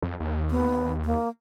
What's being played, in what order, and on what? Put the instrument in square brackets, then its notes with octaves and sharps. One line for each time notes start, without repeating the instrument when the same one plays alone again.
[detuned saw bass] F2
D#2
[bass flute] B3
A#3